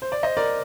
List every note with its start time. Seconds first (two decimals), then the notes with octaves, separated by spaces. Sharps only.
0.02 C5
0.12 D5
0.23 C5 D#5
0.37 A#4 D5